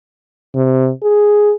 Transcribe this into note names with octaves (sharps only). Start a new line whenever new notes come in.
C3
G#4